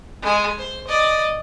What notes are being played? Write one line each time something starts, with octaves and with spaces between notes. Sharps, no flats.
G#3 G#5
C5
D5 D#5